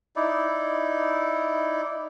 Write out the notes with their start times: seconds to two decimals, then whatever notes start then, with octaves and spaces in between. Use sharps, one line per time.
0.16 D#4 E4 D5